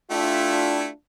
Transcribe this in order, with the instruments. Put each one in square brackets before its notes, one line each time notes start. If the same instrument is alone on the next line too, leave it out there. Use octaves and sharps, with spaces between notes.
[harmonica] A3 E4 G4 [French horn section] D4 F4